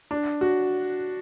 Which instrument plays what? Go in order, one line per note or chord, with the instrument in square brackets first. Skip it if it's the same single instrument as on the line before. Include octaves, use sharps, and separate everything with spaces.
[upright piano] D4
F#4